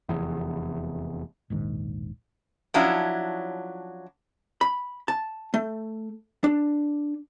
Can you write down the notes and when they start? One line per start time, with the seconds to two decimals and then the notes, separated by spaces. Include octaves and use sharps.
0.09 F1 E2
1.50 E1 A#1 G#2 D#3
2.74 F3 F#3 C#4 D4 E4
4.61 B5
5.08 A5
5.54 A3
6.44 D4